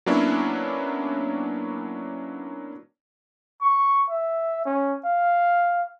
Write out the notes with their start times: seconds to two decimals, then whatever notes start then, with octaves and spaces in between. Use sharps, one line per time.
0.06 F#3 A#3 B3 C#4 D4 E4
3.62 C#6
4.10 E5
4.66 C#4
5.05 F5